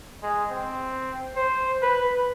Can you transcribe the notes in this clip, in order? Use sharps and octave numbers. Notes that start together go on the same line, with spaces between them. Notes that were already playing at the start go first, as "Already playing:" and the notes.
G#3
C4
C5
B4